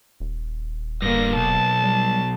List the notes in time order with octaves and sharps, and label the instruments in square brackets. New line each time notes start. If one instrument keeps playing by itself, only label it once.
[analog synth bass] D#1
[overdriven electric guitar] G2 D3 [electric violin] A#3 A#6
[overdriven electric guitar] B1 [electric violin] A5
[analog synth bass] G3